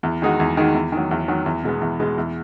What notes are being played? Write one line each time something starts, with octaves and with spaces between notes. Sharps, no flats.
E2
D#3 G#3 D#4 F#4
E2
D#3 G#3 D#4 F#4
E2
D#3
F#3
E2
D#3 F#3
E2
B2 G#3 B3
E2
B2 G#3 B3
E2